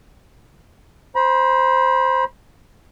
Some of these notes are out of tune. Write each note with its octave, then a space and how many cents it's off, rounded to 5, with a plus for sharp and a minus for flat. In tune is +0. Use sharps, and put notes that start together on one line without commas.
C5 +0 B5 -35